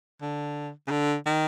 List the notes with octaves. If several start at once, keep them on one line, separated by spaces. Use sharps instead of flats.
D3
C#3
D3
D#3